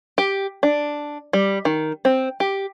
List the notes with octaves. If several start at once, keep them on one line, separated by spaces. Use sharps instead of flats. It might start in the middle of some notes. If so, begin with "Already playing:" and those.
G4
D4
G3
D#3
C4
G4